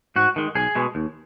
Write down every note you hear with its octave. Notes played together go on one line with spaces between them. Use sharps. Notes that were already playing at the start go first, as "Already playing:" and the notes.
G#2 F#4
D#3 G#3
B1 G#4
B2 G#3
D#2